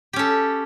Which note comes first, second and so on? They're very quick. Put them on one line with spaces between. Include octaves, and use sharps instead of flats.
G4 C#4 A4